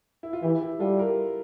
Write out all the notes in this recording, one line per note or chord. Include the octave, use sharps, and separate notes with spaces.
E4
F4
E3 E4 G4
E4 G4
G3 F4 A4
G4 A#4